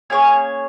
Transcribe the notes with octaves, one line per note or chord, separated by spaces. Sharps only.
A#3 C#4 G#4 C#5